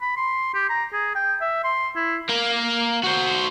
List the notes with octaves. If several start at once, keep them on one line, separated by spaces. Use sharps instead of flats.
B5
C6
G4
A#5
G#4
G5
E5
C6
E4
A#3 A#4
F#4 C5